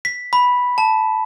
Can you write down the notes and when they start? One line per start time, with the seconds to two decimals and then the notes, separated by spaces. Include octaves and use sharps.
0.05 B6
0.33 B5
0.78 A5